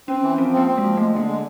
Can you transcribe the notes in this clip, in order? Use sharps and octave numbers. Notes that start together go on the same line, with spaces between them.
C4 C#4
E3
F3 C4
A#3 C4
C4
F3 G#3
G#3 A3
D3 A#3
G#3